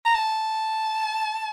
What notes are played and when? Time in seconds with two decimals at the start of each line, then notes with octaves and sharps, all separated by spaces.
0.06 A#5
0.15 A5